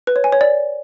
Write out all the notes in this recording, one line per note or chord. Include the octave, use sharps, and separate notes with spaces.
B4
C#5
G#5
C#5
D5